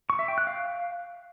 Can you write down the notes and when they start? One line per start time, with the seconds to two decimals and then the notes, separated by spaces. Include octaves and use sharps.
0.10 C#6
0.19 E5
0.28 G5
0.38 F#6
0.47 F5